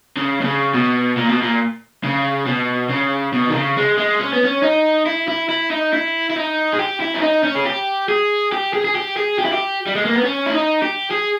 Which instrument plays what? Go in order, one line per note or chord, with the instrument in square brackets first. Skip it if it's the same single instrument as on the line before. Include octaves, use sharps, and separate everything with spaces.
[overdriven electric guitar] C#3
B2
C#3
B2
A#2
B2
A#2
C#3
B2
C#3
B2
D#3
C#3
G#3
G#3
C#4
B3
C#4
D#4
E4
E4
E4
D#4
E4
E4
D#4
G#4
G4
E4
C#4
D#4
C#4
G#4
G4
G#4
G4
G#4
G#4
G4
G#4
G4
E4
G4
G3
G#3
A#3
B3
C#4
E4
D#4
G4
G#4